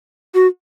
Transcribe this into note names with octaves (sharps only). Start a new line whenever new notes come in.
F#4